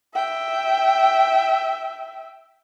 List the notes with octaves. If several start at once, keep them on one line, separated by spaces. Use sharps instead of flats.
E5 G5